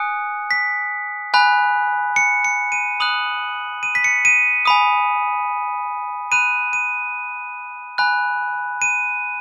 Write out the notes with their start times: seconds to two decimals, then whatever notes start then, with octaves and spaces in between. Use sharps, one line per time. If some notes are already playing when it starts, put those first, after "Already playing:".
Already playing: G#5 D#6 F#6 C#7
0.51 B6
1.34 G#5 B5 F#6
2.16 C#7
2.45 C#7
2.72 D#7
3.00 B5 D#6 F#6 F#7
3.83 D#7
3.95 B6
4.04 C#7
4.25 D#7
4.65 G#5 B5 D#6
6.32 B5 F#6 D#7
6.73 D#7
7.98 G#5 B5 F#6
8.82 D#7